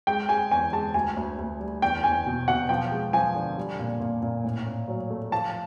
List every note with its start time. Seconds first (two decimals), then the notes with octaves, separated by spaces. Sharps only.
0.07 G#3 G5
0.29 G#3 G#5
0.51 E2 G#5
0.73 G#3 A5
0.94 D2 G#5
1.17 D2
1.39 D2
1.60 G3
1.82 E2 G5
2.03 E2 G#5
2.26 B2
2.48 B2 F#5
2.69 F3 G5
2.92 G#3
3.13 F3 G#5
3.35 D3
3.57 G3
3.79 A#2
4.00 A#2
4.22 A#2
4.44 A2
4.66 A2
4.88 F#3
5.10 A3
5.32 F3 A5